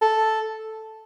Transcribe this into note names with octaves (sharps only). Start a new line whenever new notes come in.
A4